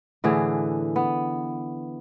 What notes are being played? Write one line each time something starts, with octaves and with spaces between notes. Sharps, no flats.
A2 D3 E3 G#4
B3